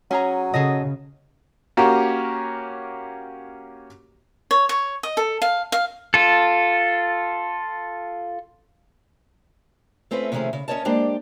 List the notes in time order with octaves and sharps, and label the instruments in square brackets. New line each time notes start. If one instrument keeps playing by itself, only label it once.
[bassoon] F#3 [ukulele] C#4 G#4 A#5
[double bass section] C#3 [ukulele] G#4 A4 D#5
[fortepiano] A#3 C#4 F#4 G4 A#4
[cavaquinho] C#5
C#5
D#5
A4
F5
F5
[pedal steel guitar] F4 A4
[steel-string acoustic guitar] A3 C4 C#4 F4 B4
C3 D#3 F3 A3 C#4 G#4
C#3
C#4 E4 A#4 C#5 D#5 A5
G#3 A#3 D4 G4 C5 D5